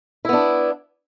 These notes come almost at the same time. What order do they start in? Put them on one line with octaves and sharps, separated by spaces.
E4 B3 D4